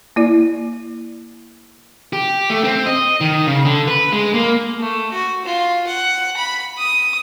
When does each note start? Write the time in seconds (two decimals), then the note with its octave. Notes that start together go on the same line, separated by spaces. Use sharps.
0.16 A#3 E4 D5
2.13 G4
2.50 A3
2.64 C4
2.86 D#5
3.21 D#3
3.47 C#3
3.65 D3
3.88 B4
4.12 G#3
4.34 A#3
4.80 A3
5.12 F#4
5.45 F4
5.87 F#5
6.37 B5
6.78 D#6